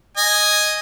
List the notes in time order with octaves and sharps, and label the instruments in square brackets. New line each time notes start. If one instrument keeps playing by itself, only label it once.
[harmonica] D#5 G#5